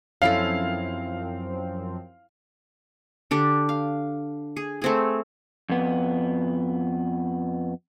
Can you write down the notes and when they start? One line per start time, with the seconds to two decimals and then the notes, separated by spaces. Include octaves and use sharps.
0.22 F#2 F3 C4 C#4 E4 A4 F5
3.31 D3 D4 G4
3.69 F5
4.57 G#4
4.82 A3 C4 G#4
5.69 F2 B3